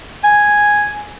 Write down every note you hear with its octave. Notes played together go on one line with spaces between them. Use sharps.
G#5